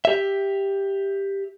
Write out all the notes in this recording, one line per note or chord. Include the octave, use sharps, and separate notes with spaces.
G4 E5